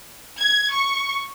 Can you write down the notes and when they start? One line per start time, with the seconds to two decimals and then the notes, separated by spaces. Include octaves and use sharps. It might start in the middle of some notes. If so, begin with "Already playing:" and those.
0.37 G#6
0.72 C#6